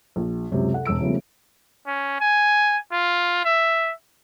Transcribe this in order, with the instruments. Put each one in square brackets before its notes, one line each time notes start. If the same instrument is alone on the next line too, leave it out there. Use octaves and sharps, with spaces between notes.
[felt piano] A#1
C#2 F#2 C3
A4 F#5
E1 G#3 E6 D7
C#3 F3 G3 A3 B3 C4
[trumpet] C#4
G#5
F4
E5